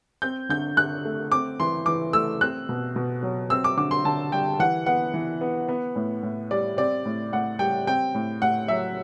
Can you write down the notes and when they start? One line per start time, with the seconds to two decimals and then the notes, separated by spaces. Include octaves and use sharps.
0.22 C4 G6
0.49 D3 G6
0.77 D3 F#6
1.05 A3
1.32 C4 D6
1.60 E3 C6
1.86 E3 D6
2.13 A3 E6
2.41 C4 F#6
2.69 B2
2.96 B2
3.23 F#3
3.50 C4 E6
3.64 D6
3.77 D3 D6
3.91 C6
4.04 D3 A5
4.32 G3 G5
4.59 E3 F#5
4.86 B3 F#5
5.14 E3
5.41 B3
5.68 B3
5.96 A2
6.23 A2
6.51 G3 D5
6.77 C4 D5
7.05 A2
7.33 A2 F#5
7.59 G3 G5
7.87 C4 G5
8.15 A2
8.42 A2 F#5
8.68 F#3 E5